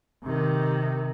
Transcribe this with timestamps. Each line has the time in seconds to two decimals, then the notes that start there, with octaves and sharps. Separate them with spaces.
0.24 C3 D#3